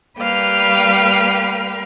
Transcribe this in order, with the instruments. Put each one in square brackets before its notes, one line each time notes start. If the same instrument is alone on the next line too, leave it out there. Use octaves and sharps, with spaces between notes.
[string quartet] G3 A#3 B4 F5 G5 F6